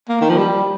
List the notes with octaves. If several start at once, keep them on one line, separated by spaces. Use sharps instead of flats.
A#3
D#3
F3
G3